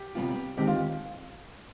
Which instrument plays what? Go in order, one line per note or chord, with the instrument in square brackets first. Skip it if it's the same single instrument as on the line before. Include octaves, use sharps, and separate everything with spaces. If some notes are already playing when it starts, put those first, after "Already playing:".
Already playing: [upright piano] G4
[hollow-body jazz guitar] C3 G3 B3 F4
[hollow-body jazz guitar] D#2 D#3 G#3 C4 [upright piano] G4
[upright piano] F4